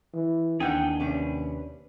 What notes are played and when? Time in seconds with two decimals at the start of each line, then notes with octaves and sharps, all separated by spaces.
0.14 E3
0.60 D#2 D4 D#4 G#4 F#5 G5 G6
1.00 C3 C#4 D4 B4